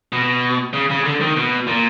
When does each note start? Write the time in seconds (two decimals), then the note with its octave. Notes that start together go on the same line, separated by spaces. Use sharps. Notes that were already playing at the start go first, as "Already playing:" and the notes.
0.12 B2
0.73 C#3
0.90 C#3
1.05 D3
1.21 D#3
1.36 B2
1.67 A#2